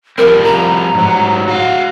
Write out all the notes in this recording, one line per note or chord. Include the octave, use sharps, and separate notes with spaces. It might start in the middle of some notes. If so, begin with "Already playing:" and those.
F3 G3 C4 A#4
A#5
G#2 F#3
F#4 F5